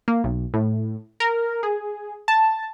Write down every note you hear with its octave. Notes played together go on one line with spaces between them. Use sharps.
A#3
B1
A2
A#4
G#4
A5